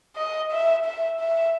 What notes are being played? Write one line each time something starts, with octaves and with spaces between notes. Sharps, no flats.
D#5
E5
E5
E5